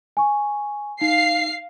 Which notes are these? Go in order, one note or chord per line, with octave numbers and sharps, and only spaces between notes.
G#5 C#6
D#4 F5 C7